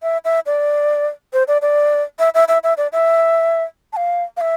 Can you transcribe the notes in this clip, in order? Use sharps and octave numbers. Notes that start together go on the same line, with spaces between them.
E5
E5
D5
C5
D5
D5
E5
E5
E5
E5
D5
E5
A5
F5
F5
E5